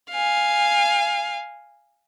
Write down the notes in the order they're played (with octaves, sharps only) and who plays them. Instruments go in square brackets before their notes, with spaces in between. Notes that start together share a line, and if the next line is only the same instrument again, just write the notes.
[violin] F5 G#5